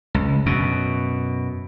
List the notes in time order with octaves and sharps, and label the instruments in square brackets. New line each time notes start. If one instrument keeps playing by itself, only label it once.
[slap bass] C#2
F#2 B2